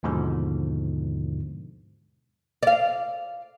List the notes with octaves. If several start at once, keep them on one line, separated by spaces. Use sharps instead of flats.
D#2 G#2 B2 D3 F3
D5 F5